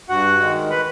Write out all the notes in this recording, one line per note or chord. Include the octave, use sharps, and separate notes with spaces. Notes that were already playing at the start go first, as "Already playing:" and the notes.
G2 F#4 F#5
D#3 G#3
B4 B5